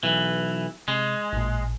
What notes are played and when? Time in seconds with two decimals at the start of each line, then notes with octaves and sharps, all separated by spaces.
0.03 B1 E3
0.88 C3 G#3
1.33 A1 A#2